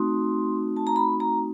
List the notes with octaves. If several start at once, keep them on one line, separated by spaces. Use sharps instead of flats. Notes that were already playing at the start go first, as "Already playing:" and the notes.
Already playing: A3 C4 D#4 F#4 C6
A5
A#5
B5
A#5